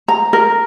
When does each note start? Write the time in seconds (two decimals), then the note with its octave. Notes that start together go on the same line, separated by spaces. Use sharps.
0.08 A#5
0.33 A#4